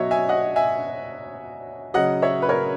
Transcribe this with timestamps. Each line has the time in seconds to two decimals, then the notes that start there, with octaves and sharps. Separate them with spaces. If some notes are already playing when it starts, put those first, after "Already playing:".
Already playing: B2 F#3 C#5 D#5 E5
0.11 E5 G#5
0.29 D#5 F#5
0.56 E5 G#5
1.94 C#3 F#3 D#5 F#5
2.22 C#5 E5
2.42 B4
2.49 A#4 C#5